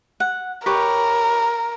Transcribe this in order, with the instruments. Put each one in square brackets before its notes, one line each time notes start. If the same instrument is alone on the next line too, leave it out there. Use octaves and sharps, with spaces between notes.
[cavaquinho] F#5
[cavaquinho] G4 B4 C#5 [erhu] A#4